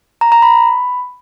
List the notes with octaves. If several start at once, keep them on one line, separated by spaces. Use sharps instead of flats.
A#5
A#5
B5